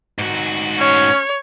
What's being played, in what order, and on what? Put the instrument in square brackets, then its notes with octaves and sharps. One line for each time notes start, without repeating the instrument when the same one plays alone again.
[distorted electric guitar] G#2 F#4
[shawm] C#4 [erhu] C#5